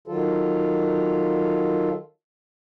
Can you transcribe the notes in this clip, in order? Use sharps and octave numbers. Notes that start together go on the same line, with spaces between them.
D#3 F#3 F4 A4